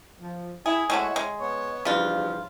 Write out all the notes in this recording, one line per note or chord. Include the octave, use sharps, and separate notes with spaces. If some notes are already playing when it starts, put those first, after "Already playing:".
F3
E4 G#4
G#3 A3 E4 F#4 C#5
G#3
B3 C#5
E2 G2 C#3 F3 F4